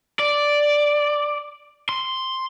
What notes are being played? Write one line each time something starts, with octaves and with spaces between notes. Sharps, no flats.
D5
C6